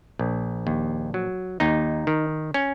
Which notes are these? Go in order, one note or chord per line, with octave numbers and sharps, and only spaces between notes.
A#1
D#2
F#3
D#2 D#4
D#3
C#4